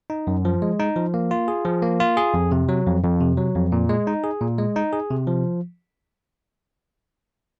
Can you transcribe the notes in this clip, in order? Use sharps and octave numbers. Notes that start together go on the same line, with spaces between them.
D#4
F#2
F3
G#3
D#4
F3
A#3
F4
G#4
F3
A#3
F4
G#4
F2
C3
F#3
F2
F2
C3
F#3
F2
A#2
G#3
D#4
G#4
A#2
G#3
D#4
G#4
C3
F3